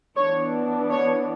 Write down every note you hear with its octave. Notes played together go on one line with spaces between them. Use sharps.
E3 B3 D4 C#5
C#5